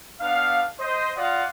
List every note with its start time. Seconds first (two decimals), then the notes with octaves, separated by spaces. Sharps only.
0.21 B3 D4 F5
0.79 C5 D#5
1.16 F4 D5 D#5 F5 F#5